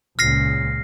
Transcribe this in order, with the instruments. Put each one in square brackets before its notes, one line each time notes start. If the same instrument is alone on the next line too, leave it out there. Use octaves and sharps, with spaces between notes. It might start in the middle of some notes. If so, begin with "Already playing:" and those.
[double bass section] C#2 A#2 C#3 [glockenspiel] F6 A#6 C7